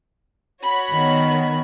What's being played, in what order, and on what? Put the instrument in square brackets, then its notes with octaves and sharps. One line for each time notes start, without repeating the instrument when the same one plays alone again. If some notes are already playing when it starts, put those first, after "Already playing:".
[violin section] F#4 C#5 B5
[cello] D#3 B3